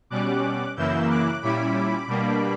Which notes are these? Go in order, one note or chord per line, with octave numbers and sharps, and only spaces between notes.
B2 G3 C#4 D6 F#6
F#2 C#3 E3 A#3 E4 E6 G6
D6 F#6
A#2 G3 C#4 E4 B5 D6
B2 G3 A#3 D4